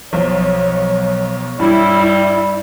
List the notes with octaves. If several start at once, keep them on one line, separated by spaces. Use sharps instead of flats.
B1 B2 F3 C#5
G2 G3 E4